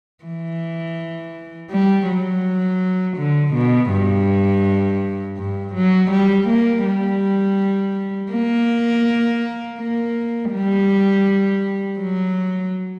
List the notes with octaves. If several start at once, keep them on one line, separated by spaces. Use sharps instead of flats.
E3
G3
F#3
D3
B2
G2
G2
F#3
G3
A#3
G3
A#3
A#3
G3
F#3